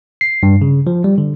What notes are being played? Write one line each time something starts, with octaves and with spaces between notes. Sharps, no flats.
C7
G2
C#3
F3
G3
D3